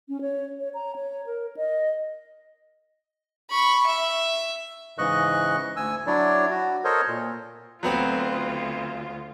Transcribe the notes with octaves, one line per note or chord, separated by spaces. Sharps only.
C#4
C#5
C#5
A#5
C#5
A#4
D#5
B5 C#6
E5
G#2 C#3 E3 D#5 C#6 F#6
D2 G#5 E6
F#3 D4 E4 C#5 D5
F#4
A4 A#4 C5 C#5 D#5
A#2
D2 F#3 B3 C4 F4